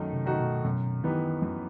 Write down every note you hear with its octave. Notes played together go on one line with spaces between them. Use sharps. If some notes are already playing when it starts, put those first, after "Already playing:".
Already playing: F#2 D#3 A3 D#4
C3
D#3 A3 D#4 F#4
B2
F#2 B2
D#3 E3 B3 D#4 G4
F#2 F#3